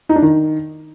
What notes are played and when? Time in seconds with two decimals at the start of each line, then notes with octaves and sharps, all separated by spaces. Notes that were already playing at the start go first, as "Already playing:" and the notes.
0.09 D#4
0.16 D4
0.22 D#3